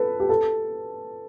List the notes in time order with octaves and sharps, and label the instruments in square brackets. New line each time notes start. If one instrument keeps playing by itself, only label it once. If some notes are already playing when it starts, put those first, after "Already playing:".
Already playing: [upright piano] A4 B4
G4
A4